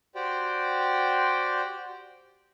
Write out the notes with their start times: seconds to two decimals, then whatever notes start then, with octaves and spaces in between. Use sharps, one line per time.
0.15 F#4 G4 C5 D5 G5